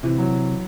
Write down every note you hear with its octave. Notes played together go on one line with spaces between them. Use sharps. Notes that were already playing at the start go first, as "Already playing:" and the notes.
C3 E3
F#3